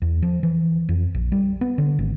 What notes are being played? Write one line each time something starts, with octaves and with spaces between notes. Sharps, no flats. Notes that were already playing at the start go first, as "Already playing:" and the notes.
E2
F3
E3
F2
A#1
G3
B3
D3
G#1